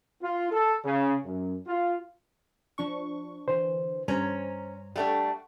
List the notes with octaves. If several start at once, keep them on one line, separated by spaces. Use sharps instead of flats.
F4
A4
C#3
F#2
F4
F3 D4 C#6
D3 E3 C5
G2 C#4 C5 C#5 A#5
G3 A3 D4 F#5 C#6